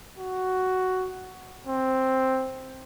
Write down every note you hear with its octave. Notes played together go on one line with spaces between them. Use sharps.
F#4
C4